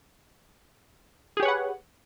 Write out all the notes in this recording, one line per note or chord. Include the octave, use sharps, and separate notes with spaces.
G4 G#4 B4 C#5 F#5